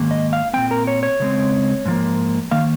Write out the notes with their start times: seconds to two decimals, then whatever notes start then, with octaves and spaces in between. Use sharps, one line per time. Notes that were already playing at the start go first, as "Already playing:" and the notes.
Already playing: G#2 D#3 A#3
0.11 D#5
0.33 F5
0.53 A#2 G#3 C4 G5
0.71 A#4
0.87 C#5
1.03 C#5
1.20 C#3 G#3 C4
1.85 G#2 F3 A#3
2.51 D#3 A#3 F5